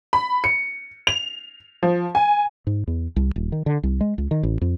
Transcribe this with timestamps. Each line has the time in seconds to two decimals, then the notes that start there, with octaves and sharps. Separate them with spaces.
0.13 B5
0.44 C#7
1.07 F7
1.83 F3
2.15 G#5
2.67 G#2
2.87 E2
3.16 C2
3.36 D#1
3.52 D#3
3.66 D3
3.83 C2
4.01 G#3
4.18 C#2
4.31 D#3
4.43 A1
4.61 F2